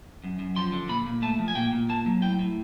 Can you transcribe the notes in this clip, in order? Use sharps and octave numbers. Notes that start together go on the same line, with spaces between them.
F#2
F#2
F3 C6
D3
A#2 B5
A#2
A3 A5
F3
G#5
A#2 G5
A#2
A#3 A5
F#3
A2 G5
A2